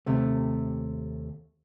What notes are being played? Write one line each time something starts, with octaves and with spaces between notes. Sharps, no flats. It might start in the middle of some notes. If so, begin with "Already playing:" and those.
D#2 C3 A3